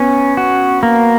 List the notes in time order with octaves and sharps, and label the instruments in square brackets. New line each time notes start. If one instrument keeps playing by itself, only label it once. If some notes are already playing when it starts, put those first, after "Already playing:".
Already playing: [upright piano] B3 [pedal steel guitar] C#4
[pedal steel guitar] F#4
A#3